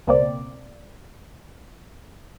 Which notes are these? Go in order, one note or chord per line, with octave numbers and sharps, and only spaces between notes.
C#2 B2 A#3 C4 D5